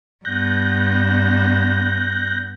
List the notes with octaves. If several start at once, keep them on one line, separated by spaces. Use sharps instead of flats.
G2 B3 F#6 G6 A#6